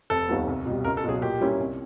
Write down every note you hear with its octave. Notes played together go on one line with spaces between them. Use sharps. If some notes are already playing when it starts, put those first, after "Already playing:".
F1 A4
D#2 D#3 G3 B3
C2
B2 G3
C#2 A#4
A4
B2 F#3 G#4
A#2 G4
G3 A#3 C#4 E4
C2